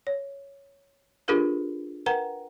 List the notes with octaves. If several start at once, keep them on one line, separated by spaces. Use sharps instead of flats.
C#5
D4 F4 G4 G#4 A#4 B4
A#4 B4 F#5 G5 A#5